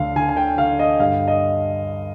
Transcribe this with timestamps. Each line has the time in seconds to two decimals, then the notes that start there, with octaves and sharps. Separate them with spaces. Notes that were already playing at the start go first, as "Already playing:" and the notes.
Already playing: D2 D3 F5
0.16 D3 G#5
0.29 G#5
0.37 G5
0.58 D3 F5
0.79 D#5
0.99 G2 F5
1.28 D#5